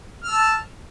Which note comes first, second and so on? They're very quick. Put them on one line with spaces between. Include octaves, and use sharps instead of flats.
F6 E6 A5